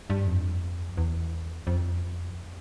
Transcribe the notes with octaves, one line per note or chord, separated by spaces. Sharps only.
G2
F2
E2
F2